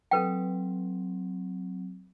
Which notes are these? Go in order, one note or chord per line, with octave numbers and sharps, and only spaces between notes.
F#3 C4 A4 B4 G5